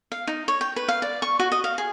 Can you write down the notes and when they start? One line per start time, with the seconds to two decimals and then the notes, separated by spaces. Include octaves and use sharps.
0.12 F5
0.27 D#4
0.48 C#5
0.61 G5
0.76 B4
0.88 F5
1.02 D5
1.22 C#6
1.39 F#4
1.52 D#5
1.64 F5
1.78 G#4